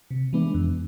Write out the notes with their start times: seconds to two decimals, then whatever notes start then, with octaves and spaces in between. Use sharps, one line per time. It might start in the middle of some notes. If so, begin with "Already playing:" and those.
0.11 C3
0.33 E3 G#3 B3 D4
0.54 F2